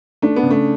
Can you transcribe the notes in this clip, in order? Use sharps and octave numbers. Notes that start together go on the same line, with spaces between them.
A3 D4
B3
C#3
A3